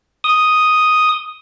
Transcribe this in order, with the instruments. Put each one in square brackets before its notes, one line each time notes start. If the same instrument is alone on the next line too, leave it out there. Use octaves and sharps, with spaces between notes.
[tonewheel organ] D#6